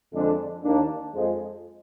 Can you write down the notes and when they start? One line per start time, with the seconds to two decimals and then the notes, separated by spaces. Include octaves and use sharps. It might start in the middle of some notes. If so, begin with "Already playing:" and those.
0.14 F2 D3 G#3 D4
0.63 D#2 D#3 A#3 D4
1.13 F2 F3 G#3